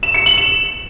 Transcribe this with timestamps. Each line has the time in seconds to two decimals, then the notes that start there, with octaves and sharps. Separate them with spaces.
0.03 E7
0.14 C#7
0.26 F#7
0.38 E7